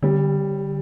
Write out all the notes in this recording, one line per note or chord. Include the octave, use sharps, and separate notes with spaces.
D3 G3